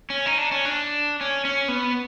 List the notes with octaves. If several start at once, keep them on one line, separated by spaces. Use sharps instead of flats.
C#4
D#4
D4
C#4
D4
C#4
C#4
B3